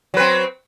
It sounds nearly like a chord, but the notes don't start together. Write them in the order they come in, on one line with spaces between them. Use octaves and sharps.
F#3 B4 C4